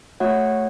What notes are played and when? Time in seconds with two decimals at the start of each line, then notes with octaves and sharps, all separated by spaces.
0.20 A3 F#4 C#5 F#5